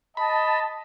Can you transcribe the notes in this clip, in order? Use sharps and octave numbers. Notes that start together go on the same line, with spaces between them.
D#5 A5 B5